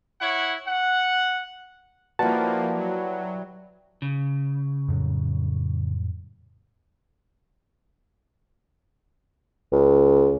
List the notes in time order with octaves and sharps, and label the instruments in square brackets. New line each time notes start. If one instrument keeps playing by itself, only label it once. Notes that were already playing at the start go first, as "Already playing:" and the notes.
[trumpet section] E4 C#5 F#5
F#5
[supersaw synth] F3 A#3 [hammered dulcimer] G3 E4 [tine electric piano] F#4 B4 F#5 [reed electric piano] A5
[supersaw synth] F#3
[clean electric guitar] C#3
[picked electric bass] F2 A2 F#3
[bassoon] C#2